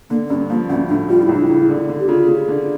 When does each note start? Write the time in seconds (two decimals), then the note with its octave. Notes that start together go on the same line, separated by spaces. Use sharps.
0.10 D3 A#3
0.29 G2 C#4
0.49 F3 A#3
0.69 D2 C#4
0.89 A2 D4
1.09 G3 F4
1.23 E4
1.29 C#2
1.36 D4
1.48 C#3 E4
1.69 D3
1.89 D3
2.00 G4
2.08 C#3 F4
2.28 C#3
2.48 D3